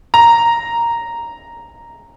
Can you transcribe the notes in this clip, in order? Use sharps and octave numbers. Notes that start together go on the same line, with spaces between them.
A#5